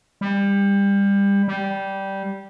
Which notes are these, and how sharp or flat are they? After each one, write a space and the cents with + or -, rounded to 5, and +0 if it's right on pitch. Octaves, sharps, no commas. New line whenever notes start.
G3 +25
G3 -10